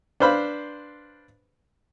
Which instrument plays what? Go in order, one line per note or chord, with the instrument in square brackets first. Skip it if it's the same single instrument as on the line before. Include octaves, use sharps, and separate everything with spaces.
[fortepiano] D4 B4 C5 F5 B5